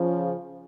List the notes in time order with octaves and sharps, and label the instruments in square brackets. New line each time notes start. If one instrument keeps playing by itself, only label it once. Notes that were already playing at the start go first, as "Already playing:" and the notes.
Already playing: [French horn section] C#3 F3